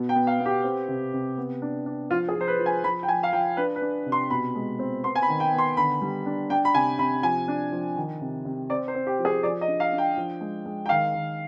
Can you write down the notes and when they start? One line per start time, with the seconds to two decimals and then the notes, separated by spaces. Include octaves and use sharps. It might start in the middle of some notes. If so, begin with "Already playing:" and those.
Already playing: B2 B3
0.09 G5
0.15 B3
0.27 F5
0.40 B3
0.46 G4
0.64 C4
0.88 C3
1.13 C3
1.37 B3
1.62 D4
1.86 D4
2.10 F3 F4
2.28 G#4
2.35 F3
2.41 C5
2.48 B4
2.59 F3
2.66 G#5
2.84 F3 B5
3.03 G5
3.08 F3 G#5
3.23 F5
3.33 F3 G5
3.57 D4 B4
3.76 B4
3.82 D4
4.06 C3
4.12 C6
4.30 B2 B5
4.55 G#3
4.79 C4
5.04 B3 C6
5.15 G#5
5.22 B5
5.28 D#3
5.40 G5
5.53 B3
5.58 C6
5.77 D3 B5
6.01 G3
6.26 D4
6.50 D4 G5
6.65 B5
6.75 C3 G#5
6.99 C3 B5
7.23 F3 G#5
7.48 D4
7.72 F3
7.96 D#3
8.21 C3
8.45 C3
8.70 C4 D5
8.88 C5
8.95 C4
9.07 G4
9.19 F3
9.25 G#4
9.43 F3 D5
9.61 D#5
9.68 D4
9.80 F5
9.92 D4
9.98 G5
10.17 F3
10.41 G#3
10.65 G#3
10.86 G5
10.89 D#3 F5
11.14 D#3